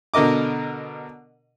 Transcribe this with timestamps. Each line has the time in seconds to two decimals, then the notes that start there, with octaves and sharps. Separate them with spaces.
0.14 B2 D3 A#4 D#5 D6